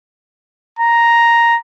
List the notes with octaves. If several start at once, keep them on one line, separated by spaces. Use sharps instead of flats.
A#5